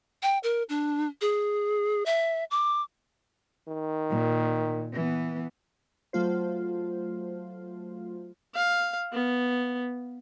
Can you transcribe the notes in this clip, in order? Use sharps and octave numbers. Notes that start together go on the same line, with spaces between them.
G5
A#4
D4
G#4
E5
D6
D#3
A#2
E3 B3
F#3 A3 F4 C5
F5
B3